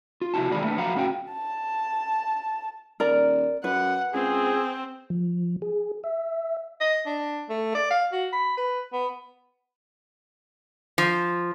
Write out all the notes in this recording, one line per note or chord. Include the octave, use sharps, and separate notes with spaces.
F4
C3 C4 E4 F#4 A5
E2 C3 D#3 G#3 D5 B5
A3 B3 D4
F3 F#3 F5 F#5 A#5 B5
A2 C#4 F#4 G5
A5
D#1 A#4 D5 A#5
F#2 B4 F#5
C#2 C4 G#4
F3
G#4
E5
D#5
D4
A3
D5
F5
F#4
B5
B4
B3
F3